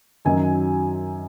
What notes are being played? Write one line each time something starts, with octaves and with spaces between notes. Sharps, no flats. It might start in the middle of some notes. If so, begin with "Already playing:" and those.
F#2 D#3 F#3 G#5